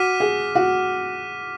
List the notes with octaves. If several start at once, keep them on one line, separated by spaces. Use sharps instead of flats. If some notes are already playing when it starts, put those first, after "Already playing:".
Already playing: F#4 D6 F6 B6 D#7
G#4
F#4